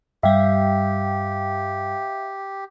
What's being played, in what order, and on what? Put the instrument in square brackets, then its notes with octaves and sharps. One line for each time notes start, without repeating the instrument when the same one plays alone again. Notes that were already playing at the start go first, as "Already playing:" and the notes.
[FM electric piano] G2 G3 [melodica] G4 [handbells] E5 F5 G5